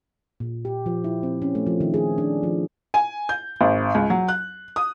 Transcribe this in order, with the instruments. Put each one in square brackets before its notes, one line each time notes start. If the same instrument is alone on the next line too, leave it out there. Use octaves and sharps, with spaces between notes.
[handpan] A#2
G4
F3
E4
C4
C#4
A3
F3
D#3
G#4
D4
F3
[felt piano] G#5
G6
G#1
C#2
F#3
F#6
D#6